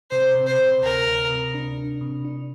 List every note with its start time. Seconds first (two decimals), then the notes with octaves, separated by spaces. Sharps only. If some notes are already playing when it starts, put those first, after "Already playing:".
0.11 C3 C5
0.35 C3
0.47 C5
0.59 C3
0.82 D2 A#4
1.07 D2
1.30 C3
1.54 D4
1.78 D4
2.01 C3
2.25 D4